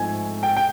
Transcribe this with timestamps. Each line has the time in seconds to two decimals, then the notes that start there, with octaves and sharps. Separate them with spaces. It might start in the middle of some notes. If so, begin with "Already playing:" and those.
Already playing: G#2 F3 A3 C4 G#5
0.43 G5
0.57 G5